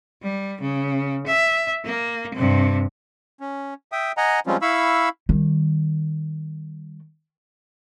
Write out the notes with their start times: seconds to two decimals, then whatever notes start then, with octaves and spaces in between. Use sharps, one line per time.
0.23 G3
0.61 C#3
1.26 E5
1.84 A#3
2.34 G2 C3
3.40 C#4
3.92 E5 G5 D#6
4.17 D#5 F#5 G#5 A#5
4.47 F3 G3 G#3 C4 C#4 F4
4.62 E4 F5 B5 C#6 E6
5.29 D#3 G3